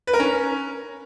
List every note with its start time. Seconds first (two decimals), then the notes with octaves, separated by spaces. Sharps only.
0.07 B4
0.13 A#4
0.20 C#4